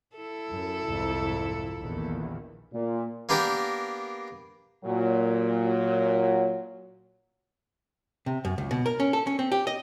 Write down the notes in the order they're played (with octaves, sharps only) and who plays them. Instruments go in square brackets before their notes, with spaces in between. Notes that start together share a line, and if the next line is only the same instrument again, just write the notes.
[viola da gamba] E4 A4
[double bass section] F#2
C2 F2 G#2
A#1 E2 D#3
[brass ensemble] A#2
[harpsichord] A#3 B3 D4 G4 A#4
[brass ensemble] A#2 F#3
[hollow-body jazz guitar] C3
F#2
C#2
B2
A#4
C#4
A4
C#4
C4
G4
D#5